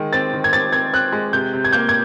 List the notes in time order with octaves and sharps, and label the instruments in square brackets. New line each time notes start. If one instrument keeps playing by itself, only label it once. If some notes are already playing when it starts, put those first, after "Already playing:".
Already playing: [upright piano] D#3 G#3
C4 A6
D#3
G#6
C4 A6
C4 G#6
C4 F#6
G#3
C3 G6
C3
G#6
A#3 G6
G#6